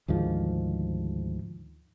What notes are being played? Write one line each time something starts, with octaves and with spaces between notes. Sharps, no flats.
D2 G#2 D#3 F3